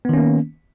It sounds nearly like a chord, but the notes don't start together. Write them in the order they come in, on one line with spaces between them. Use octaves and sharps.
B3 D#3 C#4 A#3